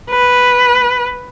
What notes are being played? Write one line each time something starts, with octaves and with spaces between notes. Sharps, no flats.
B4